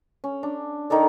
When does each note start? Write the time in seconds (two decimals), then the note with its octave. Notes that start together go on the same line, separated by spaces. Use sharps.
0.24 C#4
0.43 D4
0.90 D#3 D#4 A4 D5